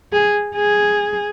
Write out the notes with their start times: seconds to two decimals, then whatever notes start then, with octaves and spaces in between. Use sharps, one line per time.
0.13 G#4
0.55 G#4